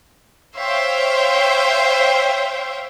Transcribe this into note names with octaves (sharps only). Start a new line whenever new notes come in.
C5 C#5 E5 F5 G5 C6